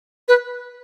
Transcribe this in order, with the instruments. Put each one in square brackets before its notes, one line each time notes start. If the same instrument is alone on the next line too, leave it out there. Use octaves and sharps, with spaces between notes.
[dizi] B4